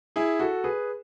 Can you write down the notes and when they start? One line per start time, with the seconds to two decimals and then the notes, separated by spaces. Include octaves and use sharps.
0.16 E4 G#4
0.39 F#4 A4
0.64 G#4 B4